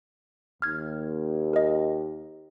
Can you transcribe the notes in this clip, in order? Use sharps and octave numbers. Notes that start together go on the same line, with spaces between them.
D#2 F6 G#6
A#4 D#5